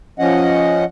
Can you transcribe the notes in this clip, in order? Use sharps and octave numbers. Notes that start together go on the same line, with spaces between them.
F3 C#4 D#5 F#5